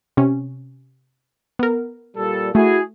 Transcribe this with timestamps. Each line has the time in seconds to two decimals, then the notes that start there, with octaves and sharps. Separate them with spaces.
0.17 C3 C#4
1.59 B3 A#4
2.17 A#2 G3 A4
2.55 A3 E4 F#4 G#4